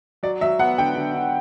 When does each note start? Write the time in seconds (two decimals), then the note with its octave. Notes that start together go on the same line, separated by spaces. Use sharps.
0.23 F#3 D5
0.41 F#3 E5
0.59 B3 F#5
0.78 D3 G5
0.95 D3
1.14 D3